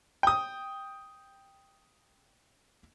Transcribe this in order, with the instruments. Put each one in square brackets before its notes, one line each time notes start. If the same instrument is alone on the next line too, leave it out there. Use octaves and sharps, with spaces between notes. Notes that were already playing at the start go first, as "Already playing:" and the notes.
[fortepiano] G5 D#6